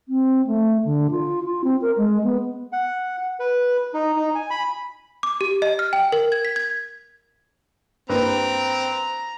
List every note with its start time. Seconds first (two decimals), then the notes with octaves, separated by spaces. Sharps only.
0.08 C4
0.47 A3
0.85 D3
1.11 F4
1.44 F4
1.64 C4
1.82 A#4
1.97 G#3
2.24 B3
2.73 F#5
3.40 B4
3.94 D#4
4.17 D#4
4.35 G#5
4.50 B5
5.23 D6
5.41 G4
5.62 D#5
5.79 F6
5.93 G5
6.12 A#4
6.32 G#6
6.45 B6
6.56 G#6
8.09 G2 A#3 C4 B4 A#5